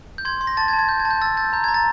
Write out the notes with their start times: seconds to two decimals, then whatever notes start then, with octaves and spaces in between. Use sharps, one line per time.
0.18 G6
0.25 C6 G#6
0.41 C6
0.47 A#6
0.57 A5 A6
0.68 G#6
0.73 A5
0.79 G#6
0.89 G6
1.00 G#6
1.05 A5
1.10 G6
1.22 E6 A6
1.37 G6 A6
1.53 A#5 G6
1.64 G#6
1.68 A#5
1.74 A6